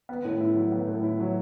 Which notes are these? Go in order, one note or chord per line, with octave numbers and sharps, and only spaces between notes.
B3
A2
E4
F#3
B3
A2
E4
F#3